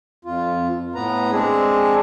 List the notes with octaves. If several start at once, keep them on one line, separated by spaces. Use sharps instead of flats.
F2 F4
A2 B3 B4 A#5
G#3 C4 D4 G#4